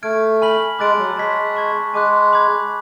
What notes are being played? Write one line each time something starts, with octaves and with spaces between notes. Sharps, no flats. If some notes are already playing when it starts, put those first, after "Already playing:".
A3 F6 G#6 D7
G#5 B5 F6 B6 F#7
G#3 A5 D6 F#6 A6 D7
F#3
G#3 A5 C#6 G#6 B6
A5 C#6 G#6
G#3 G#5 D6 F#6
B5 D6 G#6